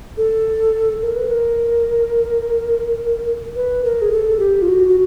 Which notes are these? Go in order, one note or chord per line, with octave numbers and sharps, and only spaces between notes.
A4
A#4
B4
A#4
B4
A#4
G#4
A4
G4
F4
F#4
F#4